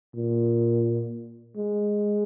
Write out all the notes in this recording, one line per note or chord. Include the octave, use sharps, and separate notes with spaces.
A#2
G#3